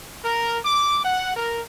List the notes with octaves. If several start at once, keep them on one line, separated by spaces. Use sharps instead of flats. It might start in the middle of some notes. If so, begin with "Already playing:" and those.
A#4
D6
F#5
A#4